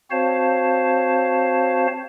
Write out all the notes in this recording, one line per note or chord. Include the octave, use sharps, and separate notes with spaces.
C4 F#4 C5 C#5 F5 A5